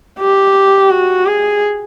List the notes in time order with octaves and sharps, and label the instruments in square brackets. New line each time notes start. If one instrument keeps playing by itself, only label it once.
[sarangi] G4
F#4
G#4